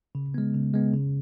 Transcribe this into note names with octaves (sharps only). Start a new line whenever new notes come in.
C#3
G#3 B3
C#3
G#3 B3
C#3